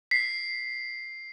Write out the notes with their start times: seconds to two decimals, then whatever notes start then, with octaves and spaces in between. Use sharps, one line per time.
0.11 B6 C7